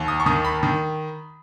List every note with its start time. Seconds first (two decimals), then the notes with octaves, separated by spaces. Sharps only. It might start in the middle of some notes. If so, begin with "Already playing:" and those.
Already playing: D#2
0.08 D#6
0.20 C#6
0.26 D#3 D#6
0.44 B5
0.63 D#3